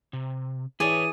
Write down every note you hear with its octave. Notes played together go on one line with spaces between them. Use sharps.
C3
E3 E4 G#4 C#5 D5 D#7